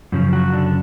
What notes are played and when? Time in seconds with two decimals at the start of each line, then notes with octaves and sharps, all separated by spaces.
0.12 F#2 C#3 F3
0.33 F#3 F#4
0.53 D3 D4